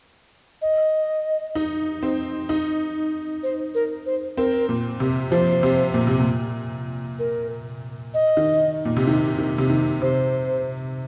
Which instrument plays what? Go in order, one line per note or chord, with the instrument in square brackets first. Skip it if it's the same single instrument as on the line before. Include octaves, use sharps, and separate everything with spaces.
[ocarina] D#5
[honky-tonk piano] D#4
C4
D#4
[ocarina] C5
A#4
C5
[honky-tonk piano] C4 [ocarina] A#4
[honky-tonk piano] A#2
C3
[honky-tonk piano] F3 [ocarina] C5
[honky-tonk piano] C3
A#2
C3
A#2
[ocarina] A#4
D#5
[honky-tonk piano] D#3
A#2
C3
D#3
D#3
C3
D#3
[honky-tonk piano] C3 [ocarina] C5